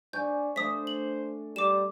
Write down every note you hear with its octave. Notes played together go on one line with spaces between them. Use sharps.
D4 G#5 C#6 G6
A3 D4 C5 D#6 B6
F#7
G3 D6 E7